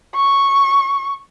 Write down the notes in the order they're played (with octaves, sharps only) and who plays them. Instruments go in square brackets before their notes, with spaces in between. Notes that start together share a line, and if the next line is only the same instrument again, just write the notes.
[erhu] C#6